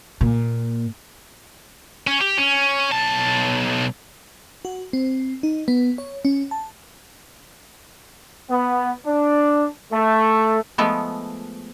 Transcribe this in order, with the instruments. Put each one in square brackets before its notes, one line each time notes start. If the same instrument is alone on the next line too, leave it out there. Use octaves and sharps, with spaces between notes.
[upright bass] A#2
[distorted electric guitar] C#4
G4
C#4
B1 A5
[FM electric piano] F#4
C4
D#4
B3
C#5
C#4
A5
[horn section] B3
D4
A3
[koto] F3 G#3 A3 B3